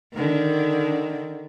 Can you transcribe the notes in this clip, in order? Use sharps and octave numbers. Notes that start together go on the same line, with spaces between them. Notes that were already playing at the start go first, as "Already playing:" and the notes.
D3 D#3